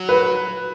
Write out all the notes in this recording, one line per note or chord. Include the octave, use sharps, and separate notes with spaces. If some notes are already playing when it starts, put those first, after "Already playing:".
Already playing: F#3
B4